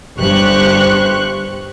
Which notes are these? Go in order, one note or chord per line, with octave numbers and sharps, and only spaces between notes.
G1 G2 G4 C5 C#6 F#6